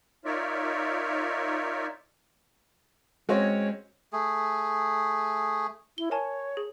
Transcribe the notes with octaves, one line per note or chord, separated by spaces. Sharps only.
D#4 F4 A#4 C#5 D5 E5
G#3 C4 C#4 F#4 C#5
A3 G#4
E4 G7
A#4 C#5 G#5 A5
G#4